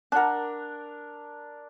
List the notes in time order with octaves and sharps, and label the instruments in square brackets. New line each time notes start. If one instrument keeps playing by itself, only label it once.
[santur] D4 A#4 [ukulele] F#5 A5